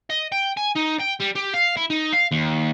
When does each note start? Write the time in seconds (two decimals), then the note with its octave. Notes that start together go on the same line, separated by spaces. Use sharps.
0.10 D#5
0.32 G5
0.57 G#5
0.76 D#4
1.00 G5
1.21 G3
1.36 G4
1.54 F5
1.77 E4
1.90 D#4
2.13 F5
2.31 D#2